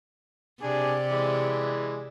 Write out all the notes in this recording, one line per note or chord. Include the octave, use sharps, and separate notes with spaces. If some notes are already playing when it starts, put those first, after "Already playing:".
C3 D4 G4 G#4 D5
E3 G#3